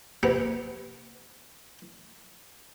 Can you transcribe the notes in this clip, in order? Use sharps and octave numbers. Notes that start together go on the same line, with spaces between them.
C3 A#3 B3